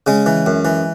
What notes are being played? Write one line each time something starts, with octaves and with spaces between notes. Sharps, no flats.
C#3 G#3
E3
F#2
E3